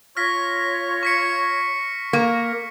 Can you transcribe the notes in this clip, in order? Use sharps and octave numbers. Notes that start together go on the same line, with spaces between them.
F4 C#5 F6 A#6 B6
C#6 B6 C#7
A#3